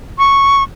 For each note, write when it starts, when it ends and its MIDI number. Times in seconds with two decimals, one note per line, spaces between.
0.18 0.63 85